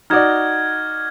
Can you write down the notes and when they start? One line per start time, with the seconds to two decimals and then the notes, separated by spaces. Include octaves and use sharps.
0.10 D#4 F#4 D5 F6 G#6